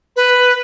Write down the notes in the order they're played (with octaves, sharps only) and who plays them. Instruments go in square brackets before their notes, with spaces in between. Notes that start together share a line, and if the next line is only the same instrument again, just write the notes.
[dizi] B4